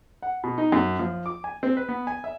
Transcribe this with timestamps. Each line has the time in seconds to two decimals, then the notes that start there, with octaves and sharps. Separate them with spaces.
0.22 F#5
0.44 B2
0.58 D#4
0.72 F#2
0.99 F3
1.26 D6
1.44 G#5
1.63 C4
1.77 B4
1.89 B3
2.07 G#5
2.24 E5